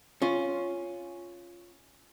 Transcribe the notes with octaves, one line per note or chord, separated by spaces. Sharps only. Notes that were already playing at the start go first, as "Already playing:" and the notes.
C#4 F4